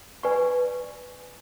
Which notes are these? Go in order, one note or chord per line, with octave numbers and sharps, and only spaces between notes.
B4 D5 G#5 C#6